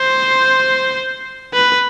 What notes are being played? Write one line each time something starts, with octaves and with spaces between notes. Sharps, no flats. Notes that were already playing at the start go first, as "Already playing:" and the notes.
Already playing: C5
B4